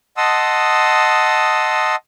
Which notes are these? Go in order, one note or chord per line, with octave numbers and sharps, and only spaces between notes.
D#5 F#5 A5 C6 D#6 E6